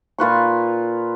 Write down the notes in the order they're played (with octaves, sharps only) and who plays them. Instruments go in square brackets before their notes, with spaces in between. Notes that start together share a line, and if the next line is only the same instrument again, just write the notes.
[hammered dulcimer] A#2 F4 B4 C#6